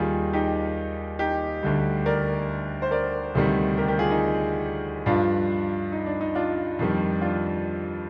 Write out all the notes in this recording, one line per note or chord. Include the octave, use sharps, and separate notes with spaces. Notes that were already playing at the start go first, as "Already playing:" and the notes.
Already playing: D#2 D#3 G3 F4 G#4
D#4 G4
D#4 G4
D2 D3 G3
A#4 D5
C5
A#4 D5
D2 C3 D#3 G3
G4 A#4
G4 A#4
F4 G#4
D#4
G2 F3 D4 F4
D#4
D4
D#4
D4 F4
F2 D#3 G3
D4 F4